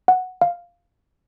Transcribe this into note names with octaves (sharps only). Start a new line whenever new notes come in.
F#5
F5